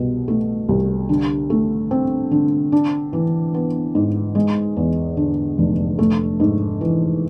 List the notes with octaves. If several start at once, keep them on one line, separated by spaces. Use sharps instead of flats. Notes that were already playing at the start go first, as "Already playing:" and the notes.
Already playing: C2 B2
A3
C2
D3
A3
C4
D3
D4
E3
B3
G#2
G#3
E2
D3
F1
A3
G#2
E3